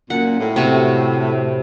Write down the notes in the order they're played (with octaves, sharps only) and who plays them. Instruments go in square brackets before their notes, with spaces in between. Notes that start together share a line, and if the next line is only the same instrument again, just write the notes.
[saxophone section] F#2 A#2 [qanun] F#5
[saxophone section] A2
[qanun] C3 F#4